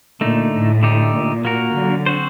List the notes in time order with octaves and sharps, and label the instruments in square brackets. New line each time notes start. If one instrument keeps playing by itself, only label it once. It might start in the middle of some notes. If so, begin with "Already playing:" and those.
[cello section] A#2 [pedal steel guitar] D3 A3 D#4
[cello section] A2
[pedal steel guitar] D3 A3 D#4 G4
[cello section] A#2
[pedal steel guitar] A#3 F#4 A#4
[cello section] D3 F#3
[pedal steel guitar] C4 F#4 C5